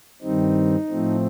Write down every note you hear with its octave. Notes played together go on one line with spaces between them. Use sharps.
G2 D#3 G3 C4 D#4
A2 F3 A3 C4